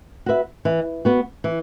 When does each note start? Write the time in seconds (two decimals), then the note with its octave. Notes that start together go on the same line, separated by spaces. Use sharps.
0.26 F#4 B4 E5
0.65 E3
1.05 B3 F#4
1.44 E3